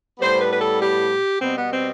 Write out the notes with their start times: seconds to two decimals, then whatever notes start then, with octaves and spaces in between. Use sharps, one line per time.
0.19 A2 G3 B3 C5
0.39 B4
0.51 B4
0.60 A4
0.80 G4
1.41 B2 G3 B3 C4
1.56 B3
1.72 C4